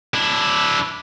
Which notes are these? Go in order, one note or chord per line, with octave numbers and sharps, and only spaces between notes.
D4 E4